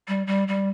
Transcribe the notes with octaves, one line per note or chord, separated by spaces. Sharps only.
G3
G3
G3